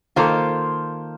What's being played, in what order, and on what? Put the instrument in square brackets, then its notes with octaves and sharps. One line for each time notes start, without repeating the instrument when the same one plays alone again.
[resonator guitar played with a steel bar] D#3 A#3 F4 A4 C5